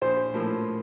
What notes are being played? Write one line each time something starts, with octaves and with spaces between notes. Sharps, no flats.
A#1 C5
A2 F3 A#3